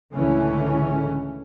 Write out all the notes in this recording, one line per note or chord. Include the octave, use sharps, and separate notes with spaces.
C#2 A2 D3 E3 A3 C#4